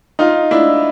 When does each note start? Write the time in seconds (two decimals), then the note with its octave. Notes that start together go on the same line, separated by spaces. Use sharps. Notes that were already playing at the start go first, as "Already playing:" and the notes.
0.19 D#4 F4
0.51 D4 E4